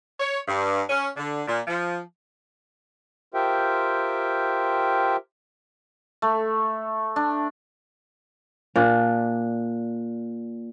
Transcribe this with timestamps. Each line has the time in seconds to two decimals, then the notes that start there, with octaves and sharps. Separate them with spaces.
0.20 C#5
0.48 G2
0.90 C#4
1.17 D3
1.48 A#2
1.68 F3
3.34 F4 G4 A#4 C5 E5 G5
6.22 A3
7.16 D4
8.76 A#2 D4